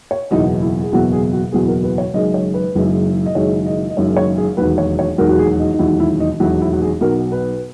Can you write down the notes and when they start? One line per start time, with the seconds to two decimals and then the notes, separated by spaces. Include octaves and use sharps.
0.11 C#5
0.31 F#1 E2 B2 F#3 D#4
0.62 E4
0.84 G#4
0.92 F#1 E2 B2 F#3 F#4
1.12 G#4
1.33 F#4
1.52 F#1 E2 B2 F#3 G#4
1.68 A#4
1.84 B4
1.98 C#5
2.14 F#1 F#2 D#3 G#3 D#5
2.34 C#5
2.54 B4
2.75 F#1 F#2 D#3 G#3
3.26 D#5
3.35 F#1 F#2 D#3 G#3 C#5
3.66 D#5
3.90 D#5
3.96 F#1 F#2 D#3 G#3 C#5
4.17 C#5
4.38 G#4
4.57 E1 D#2 D#3 F#3 B4
4.78 C#5
4.99 C#5
5.18 E1 D#2 D#3 F#3 A#4
5.29 F#4
5.39 G#4
5.59 D#4
5.74 D#4
5.79 E1 D#2 D#3 F#3 E4
6.00 E4
6.20 D#4
6.40 E1 D#2 D#3 F#3 E4
6.61 E4
6.73 F#4
6.81 G#4
7.01 B1 B2 F#3 A#4
7.32 B4